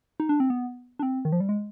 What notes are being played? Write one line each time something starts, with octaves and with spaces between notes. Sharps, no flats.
D#4
D4
C4
B3
D4
C4
D#3
F3
G3
G#3